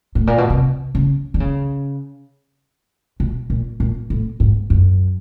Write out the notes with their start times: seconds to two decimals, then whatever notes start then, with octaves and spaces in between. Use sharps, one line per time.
0.15 A2
0.27 A#2
0.38 B2
0.50 C3
0.95 C#3
1.34 D3
1.40 C#3
3.20 B2
3.50 A#2
3.80 A#2
4.10 A2
4.40 G#2
4.70 F#2